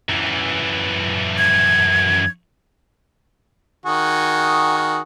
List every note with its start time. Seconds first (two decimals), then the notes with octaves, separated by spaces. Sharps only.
0.09 F#2 E3
1.38 G#6
3.86 D#3 F#4 G#4